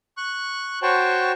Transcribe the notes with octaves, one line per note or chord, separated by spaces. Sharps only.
C#6 F#6
F#4 C5 C#5 G5 A5 C#6